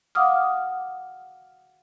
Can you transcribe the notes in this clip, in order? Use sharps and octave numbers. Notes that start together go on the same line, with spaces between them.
F5 F#5 D6 D#6 F6